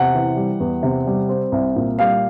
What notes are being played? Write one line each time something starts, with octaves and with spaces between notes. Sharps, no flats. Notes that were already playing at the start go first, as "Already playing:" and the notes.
Already playing: E2 C3 F#5
E3
G3
E2
C3
G3
C4
C2
A#2
G3 F5